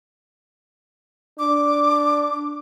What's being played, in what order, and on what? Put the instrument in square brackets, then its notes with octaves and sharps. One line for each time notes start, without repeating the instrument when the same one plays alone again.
[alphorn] D4 [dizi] D6